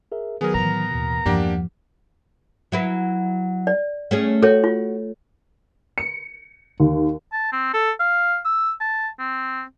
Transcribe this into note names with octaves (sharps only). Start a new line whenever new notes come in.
G#4 A#4 E5
D#3 F#3 B3 G#4 A#4
A2 E3 A#5
D#2 B2
E2 G2 F3 A#3 D4 G4 F#5
F#3 E4 B4
D5
A3 C#4 G#4
F#4 A4 C#5
F4
C#7
D#2
A5
C4
A4
F5
E6
A5
C4